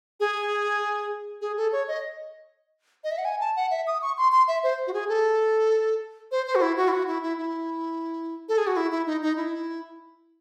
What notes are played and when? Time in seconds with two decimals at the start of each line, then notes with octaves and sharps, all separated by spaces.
0.20 G#4
1.41 G#4
1.57 A4
1.73 C#5
1.88 D#5
3.04 D#5
3.11 E5
3.18 F#5
3.25 G#5
3.40 A5
3.56 F#5
3.71 E5
3.87 D#6
4.02 C#6
4.18 C6
4.32 C6
4.48 E5
4.64 C5
4.87 F#4
4.94 G#4
5.09 A4
6.31 C5
6.47 C5
6.55 F#4
6.62 E4
6.77 F#4
6.88 E4
6.92 F#4
7.08 E4
7.23 E4
7.38 E4
8.49 A4
8.58 G#4
8.67 F#4
8.77 E4
8.91 E4
9.06 D#4
9.22 D#4
9.37 E4